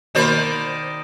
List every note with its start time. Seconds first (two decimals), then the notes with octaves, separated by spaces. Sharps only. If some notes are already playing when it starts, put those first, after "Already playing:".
0.15 B2 D#3 A#3 C5 D5 B5